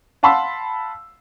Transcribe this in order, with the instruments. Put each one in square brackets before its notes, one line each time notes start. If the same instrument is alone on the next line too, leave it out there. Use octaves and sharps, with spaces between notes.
[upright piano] F5 F#5 A5 B5 C6 E6